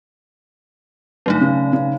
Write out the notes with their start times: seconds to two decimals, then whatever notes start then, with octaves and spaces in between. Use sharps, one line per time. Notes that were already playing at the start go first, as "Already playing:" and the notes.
1.26 G1 F#3 A3 D#4
1.41 C#3
1.73 C#3